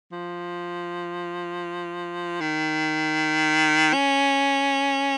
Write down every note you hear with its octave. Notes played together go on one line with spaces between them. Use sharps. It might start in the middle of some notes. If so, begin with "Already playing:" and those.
F3
D#3
C#4